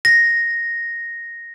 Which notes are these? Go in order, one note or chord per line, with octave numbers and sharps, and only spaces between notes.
A#6